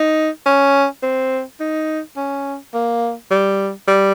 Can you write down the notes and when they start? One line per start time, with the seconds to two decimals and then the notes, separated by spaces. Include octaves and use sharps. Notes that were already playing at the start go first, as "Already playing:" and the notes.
Already playing: D#4
0.46 C#4
1.03 C4
1.60 D#4
2.16 C#4
2.74 A#3
3.31 G3
3.88 G3